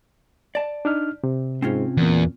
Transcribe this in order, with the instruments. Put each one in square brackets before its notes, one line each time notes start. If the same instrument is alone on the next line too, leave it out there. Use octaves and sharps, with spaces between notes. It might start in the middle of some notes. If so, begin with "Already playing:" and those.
[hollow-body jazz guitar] D5 A5
[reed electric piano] D4 D#4 F6
C3
[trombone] G#2 [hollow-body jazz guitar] C4 C#4 F4
[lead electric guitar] E2 [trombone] A#2